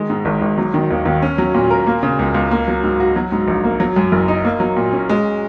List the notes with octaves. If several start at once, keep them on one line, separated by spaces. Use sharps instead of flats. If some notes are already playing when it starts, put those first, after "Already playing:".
Already playing: D#3 G#3
G#2
G#1
G#1
F#3
D#3
D#2
D#2
C#4
F#3
A#2
A#4
A#3
C#3
C#2
C#2
A#3
F#3
G#2
F#4
F#3
G#2
A#1
A#3
F#3
F#2
F#1
D#4
A#3
F#3
A#2
C#4
G#3